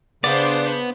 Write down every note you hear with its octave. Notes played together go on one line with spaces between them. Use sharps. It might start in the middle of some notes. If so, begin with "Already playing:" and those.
C#3 B3 D4 C5 D5